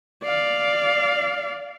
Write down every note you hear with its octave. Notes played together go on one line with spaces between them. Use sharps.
D5 F5